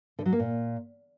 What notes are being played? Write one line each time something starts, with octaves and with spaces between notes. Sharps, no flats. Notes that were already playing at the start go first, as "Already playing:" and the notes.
D3
F#3
A#3
A#2